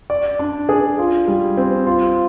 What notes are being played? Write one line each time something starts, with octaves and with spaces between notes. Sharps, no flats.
D5
D4
G#4
F4
G3
C4
F4